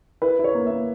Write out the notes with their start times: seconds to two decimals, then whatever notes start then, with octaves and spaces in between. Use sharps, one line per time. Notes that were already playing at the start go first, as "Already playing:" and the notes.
0.22 E4 B4
0.39 E4
0.44 C#5
0.55 A#3
0.66 A#3 E5